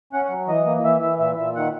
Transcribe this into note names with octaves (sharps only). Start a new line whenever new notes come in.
C#4 F#5
F#5
F#3
E3 D#5
A#3
E3 E5
E3 E5
A#2 E5
A#2 E5
D#3 F#5